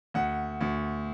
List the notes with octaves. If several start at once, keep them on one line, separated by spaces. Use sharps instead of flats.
D2 F#5
D2